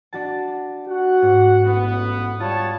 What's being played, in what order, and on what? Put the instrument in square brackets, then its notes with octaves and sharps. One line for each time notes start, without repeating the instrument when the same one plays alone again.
[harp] D4 F#4 A5
[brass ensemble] F#4 F#5
[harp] G#2
[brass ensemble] A1 B3 [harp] F#4
[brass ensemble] G3 C#5 A5 [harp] F4